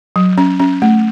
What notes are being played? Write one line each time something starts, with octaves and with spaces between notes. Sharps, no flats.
F#3
C#4
C#4
A3